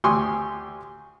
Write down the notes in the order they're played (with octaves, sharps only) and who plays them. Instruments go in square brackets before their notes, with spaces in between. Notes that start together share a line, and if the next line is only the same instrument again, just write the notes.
[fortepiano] D2 G4 G#5 C6 C#6 D#6